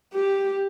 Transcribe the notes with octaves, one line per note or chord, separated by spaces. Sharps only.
G4